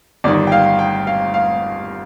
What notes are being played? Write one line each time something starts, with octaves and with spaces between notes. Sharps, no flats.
G1 G2 D#3 D5
G5
F5
G5
F5
F5